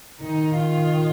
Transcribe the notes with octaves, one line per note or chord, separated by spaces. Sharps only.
D#3 D#4
F4